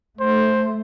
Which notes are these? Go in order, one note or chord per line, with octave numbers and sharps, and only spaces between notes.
A3 C5